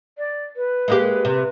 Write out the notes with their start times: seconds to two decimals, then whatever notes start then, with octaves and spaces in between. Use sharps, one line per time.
0.18 D5
0.56 B4
0.88 G#3 A#3 G4
1.25 C3